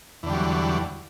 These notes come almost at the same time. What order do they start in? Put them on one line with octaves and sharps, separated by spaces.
E2 D3 G3 F#3